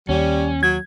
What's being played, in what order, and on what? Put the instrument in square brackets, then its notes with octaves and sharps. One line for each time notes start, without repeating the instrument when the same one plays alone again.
[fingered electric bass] D#2 [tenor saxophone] G3 [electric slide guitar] C#4
[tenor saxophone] F#3 [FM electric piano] G#6